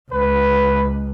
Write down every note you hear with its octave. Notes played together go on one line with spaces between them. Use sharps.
C#2 B4